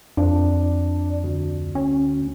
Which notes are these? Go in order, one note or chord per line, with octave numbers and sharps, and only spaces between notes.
F2 D4
D2
C#4